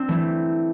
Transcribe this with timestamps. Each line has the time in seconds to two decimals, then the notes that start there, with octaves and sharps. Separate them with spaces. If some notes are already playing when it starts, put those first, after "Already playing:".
Already playing: C4 D4
0.08 E3 A3